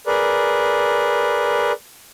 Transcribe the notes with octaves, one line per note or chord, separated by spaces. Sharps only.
G#4 A#4 B4 D5